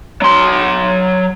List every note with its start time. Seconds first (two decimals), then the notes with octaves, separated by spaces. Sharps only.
0.22 F#3 C6